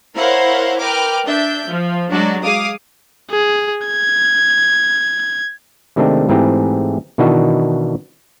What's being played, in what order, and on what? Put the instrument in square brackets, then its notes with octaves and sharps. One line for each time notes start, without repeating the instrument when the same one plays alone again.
[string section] E4 A#4 C5 C#5 F5 F#5
A#4 B4 G5 D6 F6
D4 E5 G6
F3
F#3 G#3 D4 F#4
G#4 F5 D6 D#6
[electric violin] G#4
G#6
[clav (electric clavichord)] C3 D#3 G#3 A3 C4 D4
G#2 E3 A3 C4 G4 G#4
B2 D#3 E3 D4 F#4 D#5